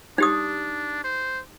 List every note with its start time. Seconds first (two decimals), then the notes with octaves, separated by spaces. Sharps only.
0.18 D4 D#4 G4 D#6
1.04 C5